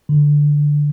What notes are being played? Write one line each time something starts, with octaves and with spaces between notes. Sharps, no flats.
D3